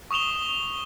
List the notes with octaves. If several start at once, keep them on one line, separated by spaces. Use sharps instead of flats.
C#6 D#6 E7 F7 G7